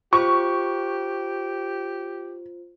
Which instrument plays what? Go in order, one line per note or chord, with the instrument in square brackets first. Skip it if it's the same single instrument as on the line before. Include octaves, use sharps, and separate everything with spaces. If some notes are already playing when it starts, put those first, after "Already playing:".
[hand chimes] F4 C5 [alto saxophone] G4 [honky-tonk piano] C#6